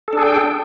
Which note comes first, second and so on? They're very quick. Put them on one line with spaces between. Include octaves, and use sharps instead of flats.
A4 D4 G#4 G5